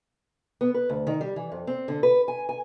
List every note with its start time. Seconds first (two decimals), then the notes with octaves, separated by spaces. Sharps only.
0.61 B3
0.74 B4
0.89 D2
1.07 D#3
1.21 G3
1.36 E3
1.52 F2
1.67 C4
1.88 D3
2.03 B4
2.28 G#5
2.49 G#5